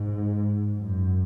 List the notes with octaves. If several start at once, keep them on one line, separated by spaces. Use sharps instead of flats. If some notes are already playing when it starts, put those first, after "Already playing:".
Already playing: G#2
F#2